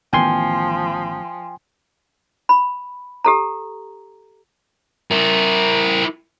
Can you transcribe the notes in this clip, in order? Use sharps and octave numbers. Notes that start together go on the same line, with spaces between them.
A1 D#3 F3 B3 G5 G#5 C6
B5
G4 A4 A#5
E4 A#4